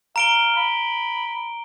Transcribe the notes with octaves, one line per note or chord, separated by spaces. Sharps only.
F5 A#5 D7 G7
B5